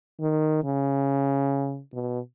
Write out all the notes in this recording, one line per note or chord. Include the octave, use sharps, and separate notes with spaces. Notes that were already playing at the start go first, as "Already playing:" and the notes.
D#3
C#3
B2